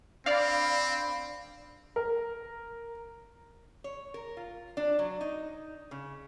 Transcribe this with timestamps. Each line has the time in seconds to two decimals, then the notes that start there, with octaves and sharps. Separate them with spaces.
0.26 C4 D4 D5 F5 B5
1.96 A#4
3.84 C#5
4.14 A#4
4.37 F4
4.77 D4
4.99 F#3
5.21 D#4
5.91 C#3